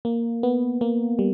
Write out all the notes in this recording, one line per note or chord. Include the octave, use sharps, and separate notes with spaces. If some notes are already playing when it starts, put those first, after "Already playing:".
A#3
B3
A#3
G3